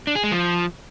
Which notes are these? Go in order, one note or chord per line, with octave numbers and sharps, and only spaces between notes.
D4
G#4
G#3
F3